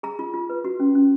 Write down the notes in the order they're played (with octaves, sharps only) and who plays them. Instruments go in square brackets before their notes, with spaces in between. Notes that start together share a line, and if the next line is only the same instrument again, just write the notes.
[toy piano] G#4 A#5
F4
F4
B4
F#4
C#4
C#4